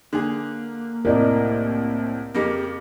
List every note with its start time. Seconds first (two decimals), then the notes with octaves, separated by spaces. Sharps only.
0.13 D3 A#3 G#4
1.05 C2 A2 A#4 D5 D#5
2.34 F2 C#3 A#3 G4